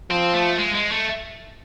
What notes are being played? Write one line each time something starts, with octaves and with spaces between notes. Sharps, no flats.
F3 C4
A3
G#3
G#3
A3